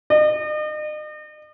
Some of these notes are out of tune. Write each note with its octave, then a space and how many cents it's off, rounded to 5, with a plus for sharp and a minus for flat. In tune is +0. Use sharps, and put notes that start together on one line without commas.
D#5 -40